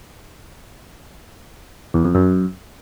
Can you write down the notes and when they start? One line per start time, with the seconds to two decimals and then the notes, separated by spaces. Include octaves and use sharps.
1.94 E2
2.04 F2
2.15 F#2